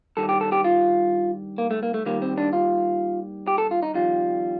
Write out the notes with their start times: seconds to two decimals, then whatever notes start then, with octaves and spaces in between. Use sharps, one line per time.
0.17 G2 D#3 G3 A4
0.29 G4
0.41 A4
0.52 G4
0.64 F4
1.58 A#3
1.71 A3
1.83 A#3
1.94 A3
2.05 D#2 D#3 G3 A#3
2.22 C4
2.38 D4
2.53 F4
3.48 G4
3.58 A4
3.71 F4
3.83 D#4
3.94 F2 D#3 G3 F4